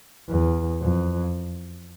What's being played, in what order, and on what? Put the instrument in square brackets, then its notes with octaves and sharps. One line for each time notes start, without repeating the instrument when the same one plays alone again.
[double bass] E2
F2